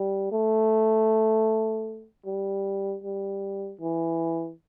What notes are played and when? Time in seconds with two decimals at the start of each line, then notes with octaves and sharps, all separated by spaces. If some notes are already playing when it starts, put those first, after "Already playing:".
Already playing: G3
0.32 A3
2.26 G3
3.04 G3
3.81 E3